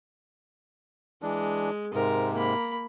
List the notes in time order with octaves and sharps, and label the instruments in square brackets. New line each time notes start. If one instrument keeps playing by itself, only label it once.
[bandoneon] E3 D4 [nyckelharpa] G#3
[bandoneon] G#2 C3 [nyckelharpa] A#4
[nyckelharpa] A#3 B5